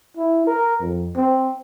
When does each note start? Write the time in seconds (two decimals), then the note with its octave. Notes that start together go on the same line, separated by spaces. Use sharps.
0.17 E4
0.47 A#4
0.81 F2
1.16 C4